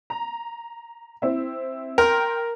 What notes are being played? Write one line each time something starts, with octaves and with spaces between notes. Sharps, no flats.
A#5
C4 E4
A#4 G5 C6